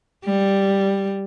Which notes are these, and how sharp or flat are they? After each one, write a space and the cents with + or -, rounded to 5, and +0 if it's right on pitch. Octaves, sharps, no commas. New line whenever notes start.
G3 +0